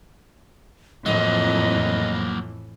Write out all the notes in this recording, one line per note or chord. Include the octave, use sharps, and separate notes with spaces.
F2 A2 E3 F#3 A#3 D#5